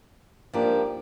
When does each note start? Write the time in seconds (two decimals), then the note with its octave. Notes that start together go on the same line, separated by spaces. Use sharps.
0.53 G#2 F3 A#3 D4 G4